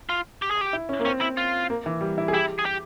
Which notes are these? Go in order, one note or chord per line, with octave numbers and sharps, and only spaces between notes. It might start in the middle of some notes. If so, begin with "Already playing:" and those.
F4
G4
G#4
G4
E4
C#4
A#3
C4 C#4
E4
F4
A#3
E3
G3
E4
G#4
E4 G4
G#4
G4